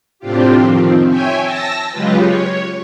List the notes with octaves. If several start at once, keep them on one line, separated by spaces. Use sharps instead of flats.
A2 C3 C4 D4 F4 G4
D#3 F3 C4
C#5 E5 G5 G#5
A5 E6 A#6
C#3 F#3 G#3 F4 G4 B4
C#5